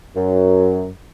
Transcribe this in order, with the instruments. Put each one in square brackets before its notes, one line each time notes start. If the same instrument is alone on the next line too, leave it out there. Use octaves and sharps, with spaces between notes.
[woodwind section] F#2